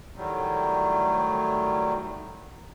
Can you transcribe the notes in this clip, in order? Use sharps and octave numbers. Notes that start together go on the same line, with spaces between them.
A2 D#3 F#3 G3